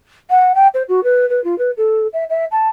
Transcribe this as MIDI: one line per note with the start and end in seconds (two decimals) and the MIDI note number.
0.30 0.52 78
0.55 0.67 79
0.74 0.83 72
0.88 1.03 66
1.03 1.28 71
1.29 1.42 71
1.44 1.58 65
1.58 1.71 71
1.77 2.07 69
2.13 2.24 76
2.29 2.45 76
2.51 2.68 81